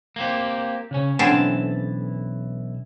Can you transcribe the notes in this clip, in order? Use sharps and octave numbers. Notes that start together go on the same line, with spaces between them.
A#3 C4 G4
C#3 C#4
B1 D3 E3 C4 C#4 A5